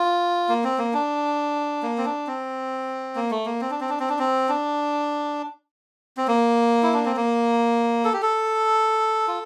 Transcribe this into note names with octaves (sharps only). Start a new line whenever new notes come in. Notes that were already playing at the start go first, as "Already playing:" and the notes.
Already playing: F4
A#3
C4
A#3
D4
A#3
C4
D4
C4
A#3
A3
A#3
C4
D4
C4
D4
C4
D4
C4
D4
C4
A#3
E4
D4
C4
A#3
A4
G4
A4
F4